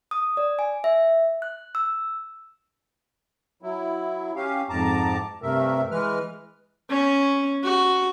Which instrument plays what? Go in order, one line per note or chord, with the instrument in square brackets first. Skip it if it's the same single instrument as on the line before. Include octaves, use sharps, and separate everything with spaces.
[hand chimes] D#6
D5
G#5
E5
F#6
E6
[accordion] F#3 E4
C#4 G4 F5
F2 G#2 A5 A#5 D6
G2 C3 A3 A#4 E5
E3 G#3 B4 F6
[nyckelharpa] C#4
F#4